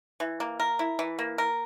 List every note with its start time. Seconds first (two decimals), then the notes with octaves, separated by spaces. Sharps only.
0.20 E3
0.40 A#3
0.60 A#4
0.79 E4
0.99 E3
1.19 A#3
1.38 A#4